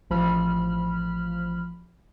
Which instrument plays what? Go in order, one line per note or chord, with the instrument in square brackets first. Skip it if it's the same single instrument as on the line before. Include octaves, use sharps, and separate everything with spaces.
[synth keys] A1 F3 B5 F6